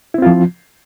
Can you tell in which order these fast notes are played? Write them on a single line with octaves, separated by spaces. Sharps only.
E4 C4 F4 F3